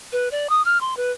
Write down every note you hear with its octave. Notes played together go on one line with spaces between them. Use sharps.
B4
D5
D#6
F6
C6
B4